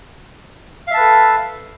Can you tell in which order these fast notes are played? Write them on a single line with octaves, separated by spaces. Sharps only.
F5 E5 A5 B4 A4